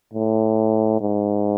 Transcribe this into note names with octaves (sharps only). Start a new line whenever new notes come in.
A2
G#2